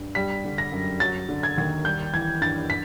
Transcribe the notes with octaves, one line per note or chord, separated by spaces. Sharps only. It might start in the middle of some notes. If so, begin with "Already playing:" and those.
Already playing: G2
G3 B6
D3
A#6
F#2
F#3 A6
D3
G#6
D#2
G3 G6
E3 G#6
G2 A6
B6